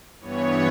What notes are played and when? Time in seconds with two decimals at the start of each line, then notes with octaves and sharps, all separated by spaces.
0.20 G2 E3 B3 C#5